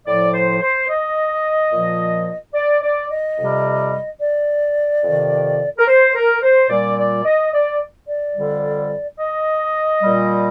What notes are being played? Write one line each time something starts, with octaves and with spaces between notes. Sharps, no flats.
A2 F3 D5
C5
C5
D#5
A#2 F3
D5
D5
D#5
F2 C3 G3
D5
F2 C3 D#3
A#4
C5
A#4
C5
A#2 G3 D5
D5
D#5
D5
D5
F2 D3 G3
D#5
A#2 G3